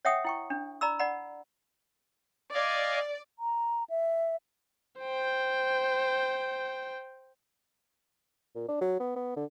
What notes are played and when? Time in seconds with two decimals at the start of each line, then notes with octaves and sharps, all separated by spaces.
0.05 C#5 E5 F#5 G5 D#6
0.25 E4 G5 C#6
0.50 D4
0.81 D5 A#5 B5 E6
0.99 D5 F#5 B5
2.54 D5 D#5 F5 G#5
3.39 A#5
3.90 E5
5.00 C5 G5
8.55 A#2
8.68 D4
8.81 F#3
9.00 B3
9.16 B3
9.37 D3